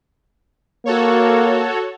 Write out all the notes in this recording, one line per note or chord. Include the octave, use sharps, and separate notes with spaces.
A#3 F#4 A4 C#5